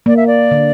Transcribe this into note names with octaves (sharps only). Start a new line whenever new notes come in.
A#3 D5
E5
D5
D3